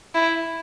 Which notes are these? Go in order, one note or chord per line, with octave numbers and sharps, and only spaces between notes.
E4